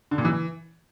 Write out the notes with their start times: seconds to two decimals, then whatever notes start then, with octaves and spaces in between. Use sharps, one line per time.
0.11 D3
0.18 A#2
0.25 E3